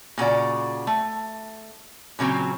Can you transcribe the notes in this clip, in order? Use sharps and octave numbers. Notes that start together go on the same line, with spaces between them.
A#2 C#3 F#4 D5
A3
A#2 C#3 F#3 C4